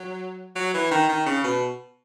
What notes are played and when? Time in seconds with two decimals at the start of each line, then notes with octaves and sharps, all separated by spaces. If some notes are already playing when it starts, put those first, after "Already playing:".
Already playing: F#3
0.56 F#3
0.74 E3
0.91 D#3
1.09 D#3
1.26 C#3
1.44 B2